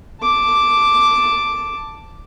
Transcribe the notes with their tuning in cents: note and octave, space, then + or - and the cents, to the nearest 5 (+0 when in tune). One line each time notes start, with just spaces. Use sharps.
A5 +0 D6 +0